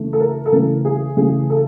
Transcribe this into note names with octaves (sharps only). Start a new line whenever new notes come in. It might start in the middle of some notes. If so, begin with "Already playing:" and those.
Already playing: C#3 E3 A3
A4
A#4
A4
C#3 E3 A3 A#4
G#4
C#3 E3 A3 G#4
A4